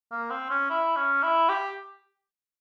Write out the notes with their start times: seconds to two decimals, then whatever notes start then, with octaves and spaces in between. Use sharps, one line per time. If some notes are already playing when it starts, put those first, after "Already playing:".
0.11 A#3
0.30 C4
0.50 C#4
0.70 E4
0.96 C#4
1.23 E4
1.49 G4